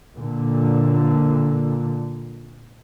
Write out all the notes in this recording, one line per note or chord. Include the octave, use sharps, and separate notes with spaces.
A#2 D3